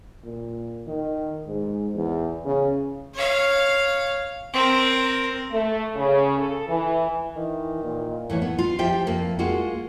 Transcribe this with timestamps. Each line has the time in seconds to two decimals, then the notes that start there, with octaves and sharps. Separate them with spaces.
0.24 A#2
0.87 D#3
1.46 G#2
1.94 E2
2.45 C#3
3.14 C#5 F5
4.54 C4 A#4
5.51 A3
5.95 C#3
6.37 A4
6.68 E3
7.36 D#3 E3
7.84 A#2
8.30 A2 E3 C#5
8.42 B3
8.59 F4
8.79 F3 G4 E5 G5
9.07 F2 A#3
9.39 G#3 A#3 F4 F#4